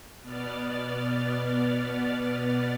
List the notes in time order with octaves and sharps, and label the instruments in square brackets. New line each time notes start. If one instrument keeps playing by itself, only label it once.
[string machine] B2 B3 D5 F6 A6